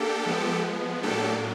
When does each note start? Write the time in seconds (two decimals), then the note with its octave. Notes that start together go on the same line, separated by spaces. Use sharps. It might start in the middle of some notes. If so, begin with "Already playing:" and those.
Already playing: A#3 D4 G4 A4
0.26 F3 G#3 B3
1.03 A2 F#3 A#3 D4 G4 A4